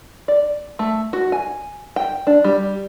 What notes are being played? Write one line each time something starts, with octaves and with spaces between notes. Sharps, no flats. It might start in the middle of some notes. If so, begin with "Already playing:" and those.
D5
A3
F#4
G#5
G5
D4
G3